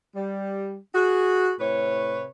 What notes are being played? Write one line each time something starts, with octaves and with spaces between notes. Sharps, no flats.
G3
F#4 G#4
A2 C3 B4 C#5